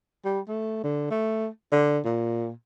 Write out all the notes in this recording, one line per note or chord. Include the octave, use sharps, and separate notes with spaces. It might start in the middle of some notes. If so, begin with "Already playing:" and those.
G3
A3
D3
A3
D3
A#2